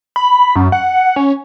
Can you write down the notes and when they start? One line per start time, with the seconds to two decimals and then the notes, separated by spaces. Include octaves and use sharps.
0.16 B5
0.56 F#2
0.72 F#5
1.16 C#4